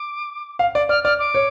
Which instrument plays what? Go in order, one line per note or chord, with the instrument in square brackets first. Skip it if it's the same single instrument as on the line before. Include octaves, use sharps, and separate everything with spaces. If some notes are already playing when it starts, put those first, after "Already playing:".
Already playing: [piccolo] D6
[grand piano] F5
D5
[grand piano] D5 [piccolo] F6
[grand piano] D5 [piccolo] F6
[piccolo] D6
[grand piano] C#5